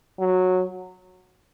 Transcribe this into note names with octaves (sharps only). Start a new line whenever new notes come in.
F#3